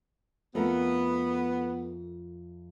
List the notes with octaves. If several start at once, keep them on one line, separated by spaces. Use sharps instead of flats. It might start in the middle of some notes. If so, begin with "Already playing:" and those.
F2 A3 B3 A#4